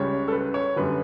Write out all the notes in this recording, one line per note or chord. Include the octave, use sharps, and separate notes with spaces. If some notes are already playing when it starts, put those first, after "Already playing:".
Already playing: C#2 C#3 G3 C#5
A4
B4
C#5
F#2 D3 G3 B4